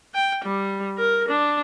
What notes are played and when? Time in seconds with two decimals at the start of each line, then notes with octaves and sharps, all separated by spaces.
0.14 G5
0.44 G3
0.98 A#4
1.28 D4